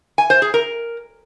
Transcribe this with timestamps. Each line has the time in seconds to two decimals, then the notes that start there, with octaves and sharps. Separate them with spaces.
0.18 G#5
0.30 C5
0.42 G#4
0.54 A#4